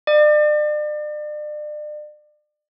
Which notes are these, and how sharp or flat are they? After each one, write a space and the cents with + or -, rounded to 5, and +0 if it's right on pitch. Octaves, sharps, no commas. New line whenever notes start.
D5 +40